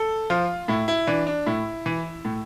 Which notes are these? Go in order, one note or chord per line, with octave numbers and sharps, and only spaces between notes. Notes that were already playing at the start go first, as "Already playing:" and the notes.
Already playing: A4
F3 F4
A2 E4
E4
E3 D4
D4
A2 E4
E3
A2